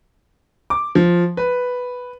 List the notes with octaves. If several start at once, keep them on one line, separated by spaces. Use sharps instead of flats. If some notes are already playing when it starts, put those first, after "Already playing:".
D6
F3
B4